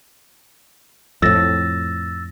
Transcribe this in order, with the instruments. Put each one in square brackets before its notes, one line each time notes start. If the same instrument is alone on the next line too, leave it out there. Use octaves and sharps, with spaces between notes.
[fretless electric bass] F2 A2 [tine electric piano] E6 A6 A#6